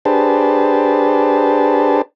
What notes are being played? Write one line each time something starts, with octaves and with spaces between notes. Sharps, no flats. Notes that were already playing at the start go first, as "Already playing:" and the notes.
D4 G4 G#4 B4 C5 A5